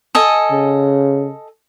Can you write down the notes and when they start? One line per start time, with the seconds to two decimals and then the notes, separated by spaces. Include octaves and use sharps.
0.15 A4 D#5 G#5
0.52 C#3